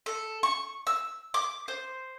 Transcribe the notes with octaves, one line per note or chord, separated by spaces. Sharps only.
A4
C#6
E6
D6
C5